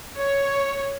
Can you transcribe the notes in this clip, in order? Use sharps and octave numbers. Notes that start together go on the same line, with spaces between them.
C#5